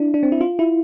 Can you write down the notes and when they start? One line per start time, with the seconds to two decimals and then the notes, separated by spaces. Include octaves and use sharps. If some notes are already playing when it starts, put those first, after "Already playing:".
Already playing: D4 E4
0.14 D4
0.23 C4
0.32 E4
0.41 F4
0.59 E4